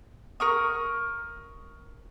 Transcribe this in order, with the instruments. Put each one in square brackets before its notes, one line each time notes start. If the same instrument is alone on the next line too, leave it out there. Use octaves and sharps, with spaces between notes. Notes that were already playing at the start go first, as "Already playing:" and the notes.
[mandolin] A#4 C#6 D#6